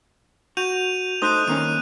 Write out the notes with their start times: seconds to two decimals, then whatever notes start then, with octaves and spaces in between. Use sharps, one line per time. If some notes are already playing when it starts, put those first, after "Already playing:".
0.57 F#4 G6 D#7 F7
1.22 A3 D#4 C5 D#6 F#6 D#7
1.48 D#3 A#3 C#4 D#7